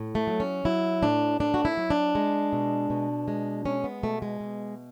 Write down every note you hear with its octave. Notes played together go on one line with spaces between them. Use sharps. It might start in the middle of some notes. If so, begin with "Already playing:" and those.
Already playing: A2
A3
F#3
C#4
F#3 E4
A2 D4
A2 D4
F#4
E4
F#3
D4
G#3
B2
B2
G#3
G#3 C#4
B3
B2 A3
G#3
B2